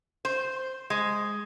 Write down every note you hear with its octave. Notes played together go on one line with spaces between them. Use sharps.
C5
G#3